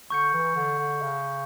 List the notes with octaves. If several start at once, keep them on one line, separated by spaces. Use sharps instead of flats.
D3 C#6 G6 C#7
E3
D3
D3
C#3